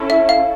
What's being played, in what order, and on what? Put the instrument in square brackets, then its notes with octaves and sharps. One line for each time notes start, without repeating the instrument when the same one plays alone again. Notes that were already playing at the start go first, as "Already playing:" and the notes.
Already playing: [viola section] C#4 E4 A4
[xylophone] E5
F5